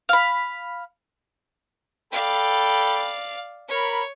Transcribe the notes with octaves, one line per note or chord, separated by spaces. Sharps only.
F5 B5
A4 D5 F5 G5 B5
A#4 C#5 B5